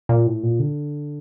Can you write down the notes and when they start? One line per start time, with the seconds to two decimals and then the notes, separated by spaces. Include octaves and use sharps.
0.09 A#2
0.27 A2
0.43 A#2
0.60 D3